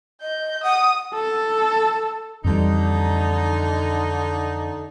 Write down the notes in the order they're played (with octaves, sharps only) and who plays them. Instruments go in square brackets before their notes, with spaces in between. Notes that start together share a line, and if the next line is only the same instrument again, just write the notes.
[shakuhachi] D#5 [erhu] G6
[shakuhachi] F#5 [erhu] D#6
[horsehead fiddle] A4
[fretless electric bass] F2 E3 G3 [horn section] D3 D#4